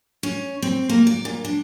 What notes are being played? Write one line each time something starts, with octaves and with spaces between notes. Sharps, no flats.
C#4
C4
A#3
D5
A#2
D4